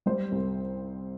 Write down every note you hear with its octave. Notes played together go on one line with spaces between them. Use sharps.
G3 C5
C2